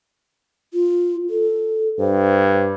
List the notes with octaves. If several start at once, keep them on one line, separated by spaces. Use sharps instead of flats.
F4
A4
G2 C5